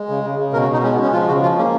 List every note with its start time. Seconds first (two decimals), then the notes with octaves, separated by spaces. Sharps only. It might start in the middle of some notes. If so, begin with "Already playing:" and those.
Already playing: G#3
0.09 C#3
0.24 C#3
0.39 C#3
0.53 B2 A#4
0.63 F#4
0.68 B2 D#4
0.83 G#3 C#4
0.94 B3
0.98 G#3 C#4
1.13 F3 F4
1.28 C#3 F#4
1.43 F3 F4
1.57 A#3 C#4